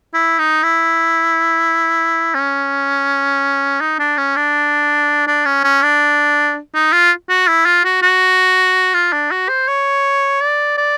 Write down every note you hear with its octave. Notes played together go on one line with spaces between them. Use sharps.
E4
D#4
E4
C#4
D#4
D4
C#4
D4
D4
C#4
C#4
D4
D#4
F4
F#4
E4
F4
F#4
F#4
F4
D4
F#4
C5
C#5
D5
D5